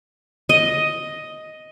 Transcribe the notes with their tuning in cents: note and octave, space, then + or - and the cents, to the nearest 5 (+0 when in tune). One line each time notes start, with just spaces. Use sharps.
D#5 +5